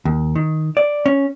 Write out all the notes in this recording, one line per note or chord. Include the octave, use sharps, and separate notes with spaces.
D#2
D#3
D5
C#4